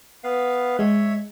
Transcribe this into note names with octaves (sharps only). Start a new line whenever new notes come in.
B3 B4 F5
G#3 C#5 E5